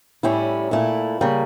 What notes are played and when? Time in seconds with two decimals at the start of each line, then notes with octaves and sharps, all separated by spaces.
0.23 A2 G3 C#4 E4
0.71 A#2 A3 E4
1.21 C#3 G3 A#3